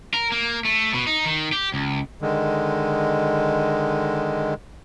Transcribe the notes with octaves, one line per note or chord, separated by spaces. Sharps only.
A#4
A#3
A3
B2
D#4
D#3
G4
C#2
D3 D#3 G#3